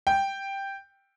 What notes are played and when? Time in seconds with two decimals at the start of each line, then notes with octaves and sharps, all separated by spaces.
0.07 G5